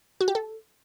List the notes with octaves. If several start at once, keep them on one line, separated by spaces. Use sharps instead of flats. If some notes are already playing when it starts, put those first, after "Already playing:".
F#4
G4
A4